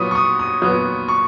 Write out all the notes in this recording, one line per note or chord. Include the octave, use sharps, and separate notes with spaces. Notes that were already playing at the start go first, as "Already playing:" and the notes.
Already playing: A#2 F#3 B3 F#4 C#6 D#6
C#6
D#6
D#6
A#2 F#3 B3 F#4 D#6
C#6